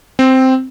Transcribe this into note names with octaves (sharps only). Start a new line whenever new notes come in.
C4